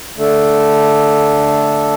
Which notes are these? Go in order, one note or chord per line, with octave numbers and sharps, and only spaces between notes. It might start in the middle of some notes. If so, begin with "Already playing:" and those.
D3 A3 D4 A4